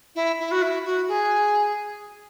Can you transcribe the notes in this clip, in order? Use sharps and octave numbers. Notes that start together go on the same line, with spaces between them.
E4
E4
F#4
E4
F#4
G#4